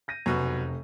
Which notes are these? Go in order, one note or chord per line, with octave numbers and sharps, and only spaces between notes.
G6 A#6 D#7
F1 F#2 B2